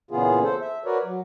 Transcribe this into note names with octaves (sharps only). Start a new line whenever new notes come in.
A#2 C#3 E3 B3 F4 G#4
A4 C5
E5
F#4 A#4 B4 C#5 D5
F#3